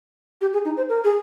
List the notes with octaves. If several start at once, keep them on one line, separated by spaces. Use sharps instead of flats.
G4
G#4
D#4
C5
A#4
G#4